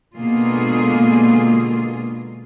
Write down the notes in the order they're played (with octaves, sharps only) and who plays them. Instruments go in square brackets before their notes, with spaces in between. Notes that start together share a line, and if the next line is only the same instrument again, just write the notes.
[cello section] B2 D3 G#3 A#3 F4 G#4